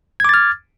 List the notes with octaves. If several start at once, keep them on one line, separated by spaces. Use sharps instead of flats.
D6 F6 G#6 A6